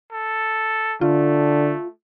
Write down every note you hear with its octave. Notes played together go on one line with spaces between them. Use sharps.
A4
D3 A3 F4